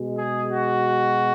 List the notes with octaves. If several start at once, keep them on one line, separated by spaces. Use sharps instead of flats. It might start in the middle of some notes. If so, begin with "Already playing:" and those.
Already playing: B2 G#3
G#4
F#4